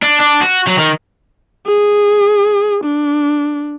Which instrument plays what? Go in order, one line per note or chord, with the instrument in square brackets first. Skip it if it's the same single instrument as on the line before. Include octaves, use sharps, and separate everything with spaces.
[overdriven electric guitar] D4
D4
F#4
F#3
D#3
[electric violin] G#4
D4